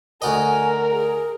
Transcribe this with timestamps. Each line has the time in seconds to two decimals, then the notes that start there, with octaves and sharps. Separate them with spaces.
0.22 D2 F#4 A#4 D#5 G#5
0.91 G#4